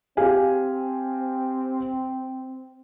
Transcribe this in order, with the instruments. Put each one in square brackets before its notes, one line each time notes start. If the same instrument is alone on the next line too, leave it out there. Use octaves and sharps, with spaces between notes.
[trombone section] C4 [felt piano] G4 F5 G#5